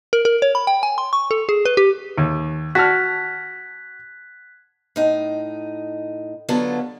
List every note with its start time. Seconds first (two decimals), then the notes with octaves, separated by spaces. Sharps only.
0.13 A#4
0.25 A#4
0.42 C#5
0.55 B5
0.67 G5
0.83 G#5
0.98 C6
1.13 C#6
1.31 A4
1.49 G#4
1.65 B4
1.77 G4
2.18 D#2
2.75 F#4 A5 F6 F#6 G#6 B6
4.96 A2 D#4
6.49 D3 F#3 B3 F4 A4